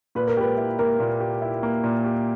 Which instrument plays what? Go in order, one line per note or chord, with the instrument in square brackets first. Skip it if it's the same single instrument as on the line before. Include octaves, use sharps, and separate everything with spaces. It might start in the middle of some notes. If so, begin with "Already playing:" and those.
[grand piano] A#2 [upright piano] B4
[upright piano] A#4
[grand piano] G4 [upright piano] B4
[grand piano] E4
[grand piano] A#3 [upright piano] A#4
[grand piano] A#2
G4
E4
A#3
A#2
G4